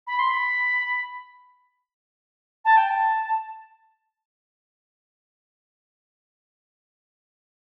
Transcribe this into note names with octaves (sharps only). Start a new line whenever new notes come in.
B5
C6
B5
A5
G5
A5